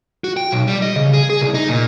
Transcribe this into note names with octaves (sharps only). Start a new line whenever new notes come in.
F#4
G5
B1
G3
D#5
C#3
G#4
G#4
C2
D#4
A#2